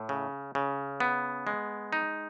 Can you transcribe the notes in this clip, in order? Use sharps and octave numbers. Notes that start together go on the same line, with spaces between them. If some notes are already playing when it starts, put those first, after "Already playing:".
Already playing: A2
C#3
C#3
B3
G#3
D#4